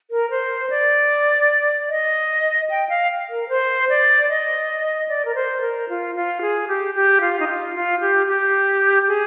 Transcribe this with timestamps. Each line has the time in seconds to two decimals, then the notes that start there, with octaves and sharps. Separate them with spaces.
0.11 A#4
0.31 C5
0.70 D5
1.89 D#5
2.70 G5
2.89 F5
3.30 A#4
3.49 C5
3.89 D5
4.29 D#5
5.08 D5
5.25 A#4
5.35 C5
5.61 A#4
5.89 F4
6.15 F4
6.41 G#4
6.68 G4
6.95 G4
7.21 F4
7.40 D#4
7.48 F4
7.75 F4
8.00 G4
8.27 G4
9.08 G#4